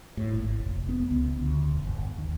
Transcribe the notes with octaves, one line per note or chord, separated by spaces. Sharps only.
A2
G#1
F1
B3
C#2
D2
E1
G1
D#2